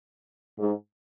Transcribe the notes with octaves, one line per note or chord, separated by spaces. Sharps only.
G#2